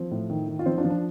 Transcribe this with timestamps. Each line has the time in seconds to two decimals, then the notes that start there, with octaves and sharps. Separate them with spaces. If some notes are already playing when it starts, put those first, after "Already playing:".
Already playing: F3 C4
0.11 A2
0.30 D#3
0.48 D#3
0.59 F4
0.66 F3 C4 D#4
0.78 D4 F4
0.84 F3
0.90 D4